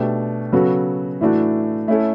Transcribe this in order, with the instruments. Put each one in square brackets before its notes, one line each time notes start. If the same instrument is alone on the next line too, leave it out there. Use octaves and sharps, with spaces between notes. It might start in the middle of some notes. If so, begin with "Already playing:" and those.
Already playing: [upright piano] B2 A3 D4 G4
C#3 F#3 B3 F#4 A4
A2 E3 A3 D4 F#4
A3 C#4 E4 A4